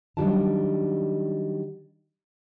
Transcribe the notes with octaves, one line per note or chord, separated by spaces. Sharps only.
D#3 F#3 G3 D4 F4 A5